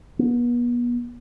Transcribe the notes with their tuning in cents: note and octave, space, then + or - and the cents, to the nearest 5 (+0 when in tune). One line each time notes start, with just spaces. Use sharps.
B3 -35